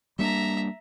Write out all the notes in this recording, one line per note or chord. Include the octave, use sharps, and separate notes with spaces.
G3 A#3 D4 E5 A#5